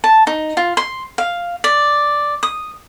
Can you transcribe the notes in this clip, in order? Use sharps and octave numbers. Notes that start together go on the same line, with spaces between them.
A5
D#4
F4
C6
F5
D5
D#6